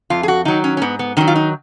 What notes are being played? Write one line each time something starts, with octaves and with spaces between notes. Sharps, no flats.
F2 F4
G#4
F#4
D#3 F#3 D#4
C#4
C#4
G#2 B3
B3
D#3 F#3 C#4
F4
D#4